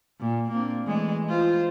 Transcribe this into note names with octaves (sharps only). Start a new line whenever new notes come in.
A#2
A#3 C4 D4
E3 G#3 A3
F4 C5